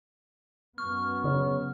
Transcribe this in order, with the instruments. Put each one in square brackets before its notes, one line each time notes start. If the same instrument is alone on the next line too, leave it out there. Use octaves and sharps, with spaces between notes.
[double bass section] F#2 B3 [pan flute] C#6 [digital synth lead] F6
[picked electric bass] C#3